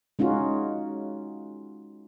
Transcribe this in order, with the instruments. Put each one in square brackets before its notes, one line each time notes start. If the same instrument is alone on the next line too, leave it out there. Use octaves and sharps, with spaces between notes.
[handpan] G#3 C#4 D#4 F4 F#4